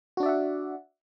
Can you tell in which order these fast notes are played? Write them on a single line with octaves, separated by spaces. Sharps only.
F#4 D4 D5 E5 F#5